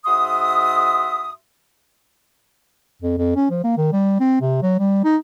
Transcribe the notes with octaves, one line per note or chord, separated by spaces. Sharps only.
G#2 F#4 E5 C6 D#6
F2
F2
C#4
F3
A#3
D#3
G3
C4
C3
F#3
G3
D#4